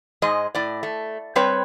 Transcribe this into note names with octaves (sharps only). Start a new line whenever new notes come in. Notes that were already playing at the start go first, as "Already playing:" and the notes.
G#2 G#3 D#5
A2 D5
A3
G3 C4 B4 C#5